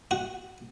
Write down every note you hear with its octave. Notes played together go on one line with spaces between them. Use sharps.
F#4